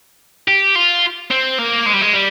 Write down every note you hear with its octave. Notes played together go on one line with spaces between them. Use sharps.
G4
F4
C4
A#3
G#3
G3
G#3
G3